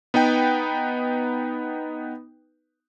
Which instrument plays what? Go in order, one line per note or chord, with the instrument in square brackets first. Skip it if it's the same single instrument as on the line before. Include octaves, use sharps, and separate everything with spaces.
[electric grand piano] B3 D#4 B4 G5